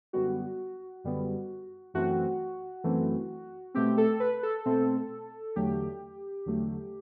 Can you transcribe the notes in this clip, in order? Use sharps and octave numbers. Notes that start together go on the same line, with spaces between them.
F#2 D3 G3 B3 F#4
F#2 D3 G3 B3
F#2 E3 A3 C4 F#4
F#2 E3 A3 C4
B2 A3 C4 G4
A4
B4
A4
B2 A3 C4
E2 D3 F#3 A3 G4
E2 D3 F#3 A3